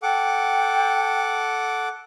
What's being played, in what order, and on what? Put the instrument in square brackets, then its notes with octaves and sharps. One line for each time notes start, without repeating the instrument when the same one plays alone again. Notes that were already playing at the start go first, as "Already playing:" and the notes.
[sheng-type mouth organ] A4 F#5 D6 [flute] G5